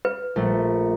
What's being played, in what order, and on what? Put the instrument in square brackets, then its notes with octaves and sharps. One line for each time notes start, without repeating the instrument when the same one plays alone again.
[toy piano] B4
[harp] A#1 A3